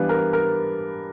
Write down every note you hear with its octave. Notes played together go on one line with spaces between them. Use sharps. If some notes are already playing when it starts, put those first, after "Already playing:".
Already playing: E3 G3 B3 D4 B4 F5
A#4
A#4